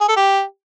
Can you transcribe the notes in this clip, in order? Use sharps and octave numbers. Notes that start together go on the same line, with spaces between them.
G#4
A4
G4